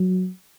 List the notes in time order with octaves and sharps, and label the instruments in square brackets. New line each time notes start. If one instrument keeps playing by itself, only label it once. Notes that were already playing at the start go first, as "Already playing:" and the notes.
Already playing: [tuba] F#3